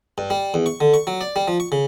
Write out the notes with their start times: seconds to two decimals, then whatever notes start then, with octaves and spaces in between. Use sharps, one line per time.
0.18 G2
0.30 G3
0.54 E2
0.66 C#6
0.81 D3
0.94 C#6
1.07 F#3
1.21 D5
1.36 G3
1.48 F3
1.60 C#6
1.72 C#3